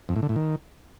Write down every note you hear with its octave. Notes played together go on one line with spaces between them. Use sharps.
F2
A2
D3
A2
D#3